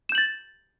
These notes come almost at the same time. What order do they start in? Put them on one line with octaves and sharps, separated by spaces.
E7 G6 F#7 A6